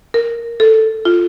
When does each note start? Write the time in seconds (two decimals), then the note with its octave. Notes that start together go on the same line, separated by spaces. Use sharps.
0.14 A#4
0.60 A4
1.05 F4